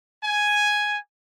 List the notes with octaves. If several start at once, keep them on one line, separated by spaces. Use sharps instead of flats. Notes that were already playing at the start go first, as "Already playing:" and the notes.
G#5